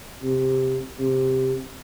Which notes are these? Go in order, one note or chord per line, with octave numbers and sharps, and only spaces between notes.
C3
C3